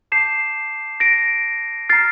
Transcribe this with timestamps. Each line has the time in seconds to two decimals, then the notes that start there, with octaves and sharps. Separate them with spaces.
0.12 A5 D6 G6 C7 E7
1.00 A#6 D7
1.89 A#5 F6 A6 C7